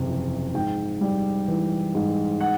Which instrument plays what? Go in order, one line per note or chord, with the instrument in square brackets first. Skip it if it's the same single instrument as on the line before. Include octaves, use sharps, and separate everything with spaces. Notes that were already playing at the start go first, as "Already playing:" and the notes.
Already playing: [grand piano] F#1 E2 C3
F3
G#2 G5
G3
E3
G#2
F#5